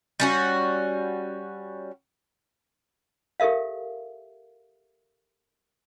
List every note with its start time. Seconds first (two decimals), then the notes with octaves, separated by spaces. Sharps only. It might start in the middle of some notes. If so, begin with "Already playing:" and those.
0.20 G3 C#4 F#4
3.40 G4 A4 A#4 E5 F5